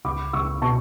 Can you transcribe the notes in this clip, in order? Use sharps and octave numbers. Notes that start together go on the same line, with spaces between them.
C#2 B5 D6
C#2 C#6 E6
B2 A5 C#6